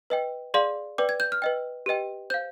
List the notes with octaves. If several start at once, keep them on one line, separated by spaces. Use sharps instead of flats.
B4 D#5 G5
G#4 D5 F5 C6
B4 D5 G5 D6
G#6
G6
F6
B4 D#5 G5
G4 B4 D#5 G5
C5 F5 G6